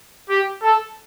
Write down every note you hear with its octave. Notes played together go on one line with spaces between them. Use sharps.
G4
A4